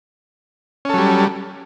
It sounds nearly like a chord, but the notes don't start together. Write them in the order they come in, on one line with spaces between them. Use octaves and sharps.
C#4 A4 F#3 G3